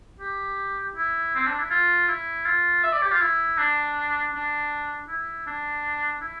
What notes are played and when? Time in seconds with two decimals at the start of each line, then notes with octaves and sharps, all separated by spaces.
0.20 G4
0.95 E4
1.35 C4
1.47 D4
1.59 E4
1.70 F4
2.08 E4
2.45 F4
2.83 E5
2.92 D5
3.02 G4
3.11 F4
3.21 E4
3.58 D4
4.33 D4
5.08 E4
5.47 D4
6.21 E4